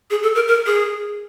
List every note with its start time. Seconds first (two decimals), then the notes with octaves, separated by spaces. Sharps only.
0.10 G#4
0.23 A4
0.35 A#4
0.48 A#4
0.66 G#4